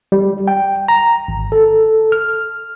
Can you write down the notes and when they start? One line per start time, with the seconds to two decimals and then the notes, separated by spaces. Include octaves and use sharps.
0.12 G3
0.48 G5
0.88 A#5
1.28 G#1
1.52 A4
2.12 F6